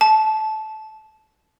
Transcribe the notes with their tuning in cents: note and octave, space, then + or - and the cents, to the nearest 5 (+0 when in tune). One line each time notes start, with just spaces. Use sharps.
A5 -20